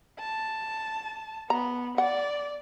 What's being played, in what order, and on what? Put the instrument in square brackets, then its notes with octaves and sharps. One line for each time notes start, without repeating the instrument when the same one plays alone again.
[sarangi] A5
[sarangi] B3 [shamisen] A#5
[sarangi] D5 [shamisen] F#5